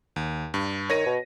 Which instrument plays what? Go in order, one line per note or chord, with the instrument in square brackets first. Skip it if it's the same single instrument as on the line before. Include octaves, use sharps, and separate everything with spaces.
[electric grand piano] D#2
G2
[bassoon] D#3 [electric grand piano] C#5 A#6 D#7
[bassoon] B2